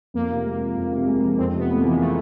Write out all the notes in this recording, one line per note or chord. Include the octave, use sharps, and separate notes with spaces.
F2 A#3
C3
G#3
F3
F2
C3
G#3
F3
F2 C4
C3
B3
A3
A#3
E3 G#3
A3